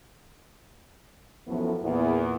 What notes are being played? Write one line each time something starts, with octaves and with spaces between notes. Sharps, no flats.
F#2 A2 E3 F3 A3 B3
E2 A#2